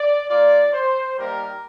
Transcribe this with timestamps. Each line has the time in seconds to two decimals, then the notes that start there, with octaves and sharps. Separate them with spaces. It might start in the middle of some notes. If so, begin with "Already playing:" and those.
Already playing: D5
0.29 A#3 F4 D5
0.73 C5
1.17 G3 A#3 D#4 G4 A#4